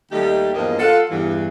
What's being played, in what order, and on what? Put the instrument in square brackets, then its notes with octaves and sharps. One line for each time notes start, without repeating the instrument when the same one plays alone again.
[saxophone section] D#2 G3 A3 D#4 G4
E2 G2 C#3 F3 A#3 D#5
F4 A4 F#5
E2 G2 E3